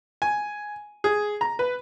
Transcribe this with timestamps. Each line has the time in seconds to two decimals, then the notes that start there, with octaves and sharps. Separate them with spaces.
0.22 G#5
1.04 G#4
1.41 A#5
1.59 B4